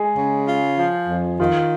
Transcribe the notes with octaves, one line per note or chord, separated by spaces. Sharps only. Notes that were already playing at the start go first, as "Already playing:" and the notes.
Already playing: G#3 G#4
C#3
F4
F3
F2
D#3 F4